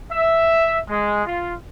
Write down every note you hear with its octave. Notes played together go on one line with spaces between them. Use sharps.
E5
G#3
F4